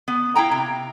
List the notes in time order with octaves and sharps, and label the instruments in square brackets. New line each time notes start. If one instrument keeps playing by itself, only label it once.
[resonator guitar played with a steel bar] B3
E4 F5 G5 A#5
C3